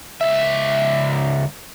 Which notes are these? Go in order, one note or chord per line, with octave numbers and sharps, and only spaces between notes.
C#2 E5